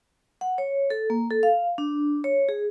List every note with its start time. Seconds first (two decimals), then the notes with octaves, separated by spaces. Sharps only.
0.41 F#5
0.58 C#5
0.90 A4
1.10 A#3
1.30 A4
1.43 F5
1.78 D4
2.24 C#5
2.49 G#4